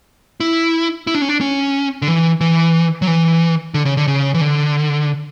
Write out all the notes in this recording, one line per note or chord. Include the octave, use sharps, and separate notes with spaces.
E4
E4
D4
C#4
D4
C#4
D3
E3
E3
F#3
E3
D3
C#3
D3
C#3
E3
D3